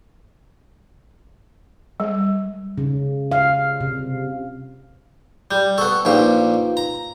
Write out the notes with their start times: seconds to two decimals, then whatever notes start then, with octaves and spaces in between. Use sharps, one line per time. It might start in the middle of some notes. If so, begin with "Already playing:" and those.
2.00 G3
2.78 C#3
3.32 F5
3.80 C3
5.51 G3 G6
5.78 B3 A4 C#6
6.05 A#1 A#2 D#4 G4 B4 F5
6.77 A#5